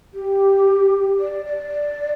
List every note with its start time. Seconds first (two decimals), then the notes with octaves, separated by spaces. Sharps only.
0.14 G4
1.20 D5
1.46 D5